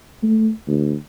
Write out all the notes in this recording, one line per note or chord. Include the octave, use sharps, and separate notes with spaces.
A3
D2